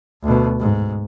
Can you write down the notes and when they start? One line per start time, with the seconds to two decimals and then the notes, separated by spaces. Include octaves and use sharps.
0.23 D2 B2
0.60 G#2